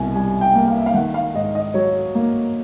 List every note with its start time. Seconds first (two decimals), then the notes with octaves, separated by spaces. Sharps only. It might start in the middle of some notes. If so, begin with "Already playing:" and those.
Already playing: C2 B2 G#5
0.14 G3 G#5
0.41 G5
0.55 A#3
0.68 F5
0.78 E5
0.86 F5
0.94 D#3 F#5
1.14 F5
1.34 G#2 D#5
1.55 D#5
1.74 F#3 C#5
2.15 A#3